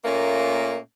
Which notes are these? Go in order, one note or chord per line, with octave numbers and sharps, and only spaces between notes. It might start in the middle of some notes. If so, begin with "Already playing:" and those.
A#2 A3 A#3 C#4